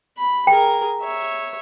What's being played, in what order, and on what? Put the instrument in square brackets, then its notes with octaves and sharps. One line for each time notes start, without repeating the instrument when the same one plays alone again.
[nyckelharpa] B5
[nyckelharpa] G#4 A#4 [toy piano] G5
[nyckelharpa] C#5 E5